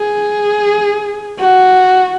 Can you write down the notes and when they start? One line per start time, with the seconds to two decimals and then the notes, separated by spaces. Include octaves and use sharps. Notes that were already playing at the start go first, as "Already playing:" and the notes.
Already playing: G#4
1.39 F#4